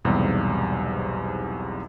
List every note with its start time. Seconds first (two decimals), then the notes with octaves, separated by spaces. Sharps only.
0.05 B1 E2 G#2 C3 G3